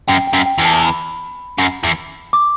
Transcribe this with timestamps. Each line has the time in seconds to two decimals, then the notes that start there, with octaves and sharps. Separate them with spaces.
0.08 F#2 G5
0.27 G5
0.33 F#2
0.46 G5
0.58 E2
0.64 A5
0.84 B5
1.59 F#2
1.84 E2
2.33 D6